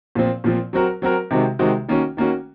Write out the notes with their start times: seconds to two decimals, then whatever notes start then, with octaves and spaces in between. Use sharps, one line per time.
0.15 A#2 F3 C4
0.44 A#2 F3 C4
0.73 F#3 C4 F#4 A#4
1.02 F#3 C4 F#4 A#4
1.31 C3 D#3 G#3 C4 F#4
1.59 C3 D#3 G#3 C4 F#4
1.88 D#3 A#3 C#4 F#4
2.17 D#3 A#3 C#4 F#4